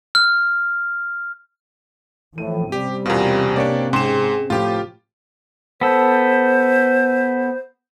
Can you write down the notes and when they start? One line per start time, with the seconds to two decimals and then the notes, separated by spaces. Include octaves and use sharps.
0.15 F6
2.38 A2 E3 F3 D#7
2.72 C3 G3 C4 C#4 G4
3.06 E2 B2 F4 A#4
3.56 A#3 D4 G4 C#5 D5 D7
3.93 G#2 G#4 G5 C6 E7
4.50 A2 F3 F4 G4
5.81 B3 A4 C5